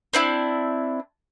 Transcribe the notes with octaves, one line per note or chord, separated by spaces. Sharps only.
C4 D4 E4